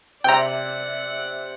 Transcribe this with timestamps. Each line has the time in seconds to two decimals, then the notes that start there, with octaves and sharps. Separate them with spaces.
0.24 C3 C5 D5 E5 F#5 G5 A#5